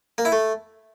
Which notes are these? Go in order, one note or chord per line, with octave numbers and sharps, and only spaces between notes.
A#3
E4
A3